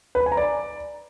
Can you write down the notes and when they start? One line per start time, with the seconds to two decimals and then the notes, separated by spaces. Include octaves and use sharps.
0.15 B4
0.21 B5
0.26 G#5
0.32 A#5
0.37 D5